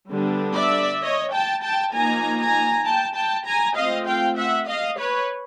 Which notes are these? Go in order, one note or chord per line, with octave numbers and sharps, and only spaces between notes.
D3 G3 B3 D4
D5 E5
C#5 D#5
G5 A5
G5 A5
F3 A#3 D#4 G#5 A#5
G#5 A#5
G5 A5
G5 A5
G#5 A#5
A3 C4 F4 D#5 F5
F5 G5
E5 F#5
D#5 F5
B4 C#5